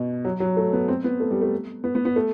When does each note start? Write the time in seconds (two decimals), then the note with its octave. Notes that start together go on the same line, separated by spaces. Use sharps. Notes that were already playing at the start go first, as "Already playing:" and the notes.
Already playing: B2
0.25 F#3
0.40 F#3
0.57 A3
0.73 B3
0.88 C4
1.04 B3
1.20 A3
1.31 G3
1.41 A3
1.84 B3
1.95 B3
2.05 B3
2.16 A3